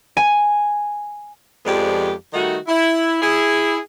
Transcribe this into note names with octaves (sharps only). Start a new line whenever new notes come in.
G#5
F2 F3 G#3 B3 G4 D5
D#3 G3 A3 D#4 F#4
E4
E4 G#4